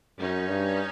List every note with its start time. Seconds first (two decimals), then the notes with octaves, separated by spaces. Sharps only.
0.20 F#2 C#4 D#4
0.49 G2